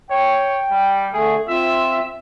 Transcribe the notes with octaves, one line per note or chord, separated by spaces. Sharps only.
C#5 G5
G3
D3 A3 G#4
C4 F4 E5